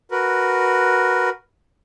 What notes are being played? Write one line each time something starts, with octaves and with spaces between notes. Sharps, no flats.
F#4 A#4 B4